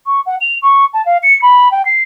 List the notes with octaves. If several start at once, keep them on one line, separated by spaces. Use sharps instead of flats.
C#6
F#5
F7
C#6
A5
F5
C#7
B5
G5
C7